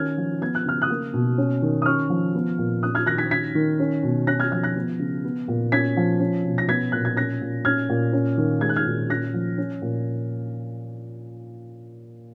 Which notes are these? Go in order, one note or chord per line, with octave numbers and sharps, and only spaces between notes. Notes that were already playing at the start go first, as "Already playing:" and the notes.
Already playing: D#3 C#4 F6 G#6
F3
B3 G#6
F#6
C#3 F6
D#6 F#6
A#3
B2
C#4
D#3
D#6
C#4 C#6 F6
F3
B3
A#2
C#4 D#6 F#6
F6 G#6
D#3 F#6 A#6
G#6 B6
C#4 G#6 B6
D#3
C#4
B2
C#4 F#6 A#6
F6 G#6
F3 F6 G#6
F#6 A#6
B3
C#3
B3
A#2
C#4 G#6 B6
F3
C#4
B2
A#6
B3 G#6 B6
A#2 F#6
G#6
C#4 F#6 A#6
A#2
C#4 F6 G#6
A#2
C#4
D#3
G#3 G#6
F#6
F6 G#6
A#2
C#4 F#6 A#6
F3
C#4
A#2